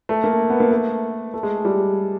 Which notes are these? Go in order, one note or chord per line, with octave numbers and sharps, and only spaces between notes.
A3
A#3
B3
A#3
A3
A3
G#3
G3